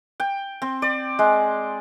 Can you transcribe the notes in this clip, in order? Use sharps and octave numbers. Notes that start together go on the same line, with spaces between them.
G5
C4
D5
G#3